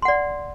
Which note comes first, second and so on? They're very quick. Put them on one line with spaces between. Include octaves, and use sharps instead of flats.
C6 F#5 D5